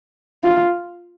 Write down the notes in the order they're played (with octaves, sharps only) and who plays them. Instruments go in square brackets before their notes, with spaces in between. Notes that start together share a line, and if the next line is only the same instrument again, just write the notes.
[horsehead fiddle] F4